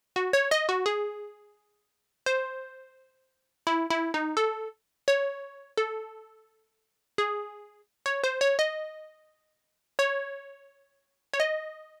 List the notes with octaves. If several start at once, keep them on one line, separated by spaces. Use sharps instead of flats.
F#4
C#5
D#5
F#4
G#4
C5
E4
E4
D#4
A4
C#5
A4
G#4
C#5
C5
C#5
D#5
C#5
C#5
D#5